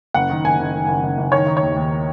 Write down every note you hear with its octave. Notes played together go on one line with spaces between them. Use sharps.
F#1 F#5
D#3
F#1 G#5
F#1
D#3
F#1
F#1
F#1
D#3 C#5
D#3
C#5
D#2
D#2